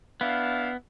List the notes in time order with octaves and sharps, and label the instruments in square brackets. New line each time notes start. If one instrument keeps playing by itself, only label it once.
[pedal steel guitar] B3 [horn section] D4 E4 F5